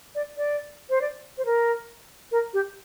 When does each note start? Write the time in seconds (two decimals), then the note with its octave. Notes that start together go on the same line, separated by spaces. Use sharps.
0.15 D5
0.37 D5
0.90 C5
1.02 D5
1.38 C5
1.46 A#4
2.32 A#4
2.54 G4